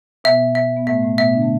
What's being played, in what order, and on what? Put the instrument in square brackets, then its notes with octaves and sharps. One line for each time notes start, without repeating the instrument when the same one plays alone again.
[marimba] B2 B3 [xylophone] E5
[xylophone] E5
[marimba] B3
[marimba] A2 A3 [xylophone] E5
[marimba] A2 A3
[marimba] B2 B3 [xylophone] E5
[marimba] D3 D4
A3